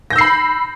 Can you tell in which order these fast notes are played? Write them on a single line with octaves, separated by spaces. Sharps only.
A#6 G6 E6 C7 B5